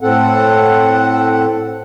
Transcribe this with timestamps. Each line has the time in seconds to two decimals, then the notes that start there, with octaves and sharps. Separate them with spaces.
0.01 A2 C4 A4 F#5